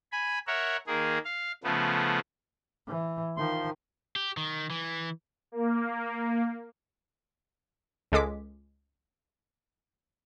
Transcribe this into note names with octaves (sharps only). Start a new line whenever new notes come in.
G#5 B5
A#4 C#5 E5 F#5
D#3 A#3 G#4
F5
C#3 F3 A3 B3
E3
D#3 F3 C6
G4
D#3
E3
A#3
C#2 G#3 A4 D6 B6